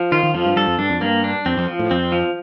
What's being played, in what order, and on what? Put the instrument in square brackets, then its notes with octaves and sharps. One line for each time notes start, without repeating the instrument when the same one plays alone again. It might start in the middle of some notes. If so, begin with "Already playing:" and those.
Already playing: [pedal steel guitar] F3
[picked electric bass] D#3 [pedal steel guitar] F4
[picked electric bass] D#3
[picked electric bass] F2 [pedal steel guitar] F3
[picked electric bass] G2
[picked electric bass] G2 [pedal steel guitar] A4
[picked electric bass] F2
[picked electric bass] G2 [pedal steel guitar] D4
[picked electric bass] F2
[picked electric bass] G2 [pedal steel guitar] A#3
[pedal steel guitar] D4
[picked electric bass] F2 [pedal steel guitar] C4
[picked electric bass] F2
[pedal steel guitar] F3
[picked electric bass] A2
[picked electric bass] F2 [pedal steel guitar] C4
[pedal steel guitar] F3